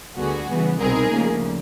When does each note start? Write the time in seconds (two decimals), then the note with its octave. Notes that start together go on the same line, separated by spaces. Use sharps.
0.16 D2 D3 G3 B3 F#4 G#4
0.49 C#3 E3 G3 B3
0.79 C2 B2 G3 C4 D#4 G#4 A#4
1.11 D2 C#3 F3 A#3